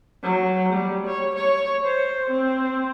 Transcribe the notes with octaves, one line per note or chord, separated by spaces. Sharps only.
F#3
G3
C#5
C#5
C5
C4